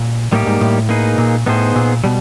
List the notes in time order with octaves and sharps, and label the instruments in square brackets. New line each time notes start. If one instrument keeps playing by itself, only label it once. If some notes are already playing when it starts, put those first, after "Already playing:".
Already playing: [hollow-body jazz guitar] A#2
[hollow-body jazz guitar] A2 [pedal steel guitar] G3 A#3 D#4 G4
[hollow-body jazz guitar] G#2
A2
[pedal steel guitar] A#3 D#4 G#4 B4
[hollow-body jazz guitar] A#2
[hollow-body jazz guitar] A2 [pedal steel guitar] B3 D#4 G#4 C5
[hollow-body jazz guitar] A#2
[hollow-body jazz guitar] B2 [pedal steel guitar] G3